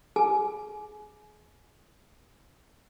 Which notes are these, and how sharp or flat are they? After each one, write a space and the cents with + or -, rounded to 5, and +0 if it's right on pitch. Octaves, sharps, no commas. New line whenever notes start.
G#4 +25 G#5 +25